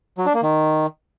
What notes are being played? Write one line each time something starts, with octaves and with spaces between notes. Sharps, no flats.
F#3
D4
A#3
D#3